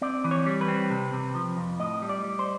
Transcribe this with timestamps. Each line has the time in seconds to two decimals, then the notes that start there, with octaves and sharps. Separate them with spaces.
0.02 C4 D5
0.24 E3
0.31 C#5
0.46 G3
0.61 B4
0.68 C4
0.90 C3
1.13 C3
1.35 F3
1.57 F2
1.79 A2 D#5
2.02 G3
2.09 D5
2.24 G3
2.39 C5